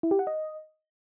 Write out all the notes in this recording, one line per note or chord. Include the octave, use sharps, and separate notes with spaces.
E4
G4
F#5
D#5